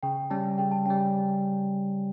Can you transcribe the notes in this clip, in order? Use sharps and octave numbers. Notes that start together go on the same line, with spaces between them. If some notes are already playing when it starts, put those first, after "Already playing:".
C#3 G5
G3 C#4 A5
C#3 G5
A5
G3 C#4 G5